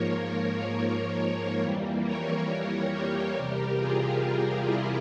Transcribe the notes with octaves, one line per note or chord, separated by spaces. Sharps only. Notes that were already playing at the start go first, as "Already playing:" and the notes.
Already playing: G#2 F3 A#3 A#4 C#5
F2 E3 G3 A#3
A#4 C#5
G4 A#4
E2 C3 G3
F4 G#4
E4 G4